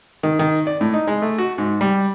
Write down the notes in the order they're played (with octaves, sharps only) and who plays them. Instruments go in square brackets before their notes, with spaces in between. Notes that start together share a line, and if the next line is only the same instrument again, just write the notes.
[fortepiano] D#3
D#3
D5
A2
D#4
G#3
A3
F#4
G#2
G3